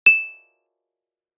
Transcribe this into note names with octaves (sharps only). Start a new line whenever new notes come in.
E7